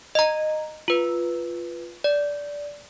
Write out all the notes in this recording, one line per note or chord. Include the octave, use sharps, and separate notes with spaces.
D#5 A#5
F4 B4
D5